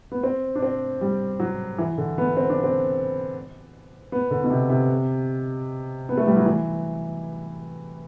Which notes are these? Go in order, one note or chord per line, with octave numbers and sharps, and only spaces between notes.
B3
C4
D4
C4
G3
F#3
E3
D3
B3
C4
D4
C4
B3
D3
B2
C3
C3
B3
A3
G3
F#3
E3